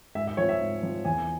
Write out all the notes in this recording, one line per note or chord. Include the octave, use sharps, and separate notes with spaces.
G#2 E5
E5
F3 C4 C#5
E5
G#2
F3 C4
E2 G#5